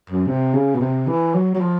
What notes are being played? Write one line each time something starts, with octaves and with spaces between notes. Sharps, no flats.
F#2
C3
C#3
B2
C3
E3
F#3
F#3
F3